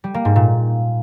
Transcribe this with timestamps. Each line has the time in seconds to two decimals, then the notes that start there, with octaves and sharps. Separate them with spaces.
0.04 G3
0.14 A#3
0.25 G#2
0.36 A#2